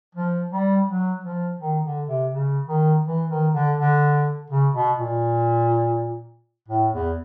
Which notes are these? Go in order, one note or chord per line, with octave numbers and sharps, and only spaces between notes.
F3
G3
F#3
F3
D#3
D3
C3
C#3
D#3
E3
D#3
D3
D3
C#3
B2
A#2
A2
E2